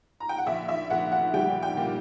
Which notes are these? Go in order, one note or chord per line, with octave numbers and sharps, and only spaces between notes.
A#5
G5
F#5
A#1 E5
E5
A#1 F#5
F#5
G3 G5
G5
A#2